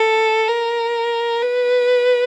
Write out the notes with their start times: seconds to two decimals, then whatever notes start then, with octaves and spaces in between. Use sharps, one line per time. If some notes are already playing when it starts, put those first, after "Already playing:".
Already playing: A4
0.48 A#4
1.42 B4